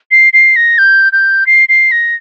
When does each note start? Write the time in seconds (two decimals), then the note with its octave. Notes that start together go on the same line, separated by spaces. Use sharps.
0.11 C7
0.33 C7
0.56 A#6
0.78 G6
1.13 G6
1.47 C7
1.69 C7
1.92 A#6